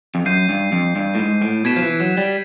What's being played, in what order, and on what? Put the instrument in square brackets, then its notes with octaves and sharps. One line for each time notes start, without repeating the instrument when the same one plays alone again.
[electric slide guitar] F2
[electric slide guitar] F#2 [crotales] G6 C7 D#7
[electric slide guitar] G2
F2
G2
A2
G#2
A2
[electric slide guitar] B2 [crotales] G#6 B6 E7
[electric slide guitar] F3
E3
F#3
G3